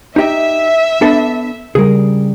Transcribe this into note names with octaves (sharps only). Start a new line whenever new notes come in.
D#4 G4 D#5 E5
B3 D4 A4
C#3 G3 G#4 A#4